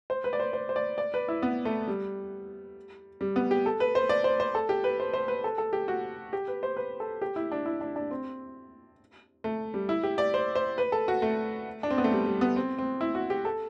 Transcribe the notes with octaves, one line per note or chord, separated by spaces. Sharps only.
C5
B4
D5
C5
C5
C5
D5
D5
B4
E4
B3
A3
G3
G3
B3
G4
A4
B4
C5
D5
C5
C5
A4
G4
B4
C5
C5
B4
A4
A4
G4
F#4
G4
B4
C5
B4
A4
G4
E4
D4
E4
D4
D4
C4
A3
G3
E4
G4
D5
C5
C5
B4
A4
F#4
A3
D4
C4
B3
A3
G3
G3
B3
C4
C4
E4
F#4
G4
A4